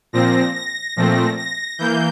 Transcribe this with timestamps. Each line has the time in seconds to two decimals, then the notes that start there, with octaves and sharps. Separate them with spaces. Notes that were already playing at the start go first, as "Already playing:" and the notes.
0.13 A#2 F3 C4 A#6
0.54 A#6
0.96 A#2 F3 A3 C4
1.37 A#6
1.78 E3 A#3 G6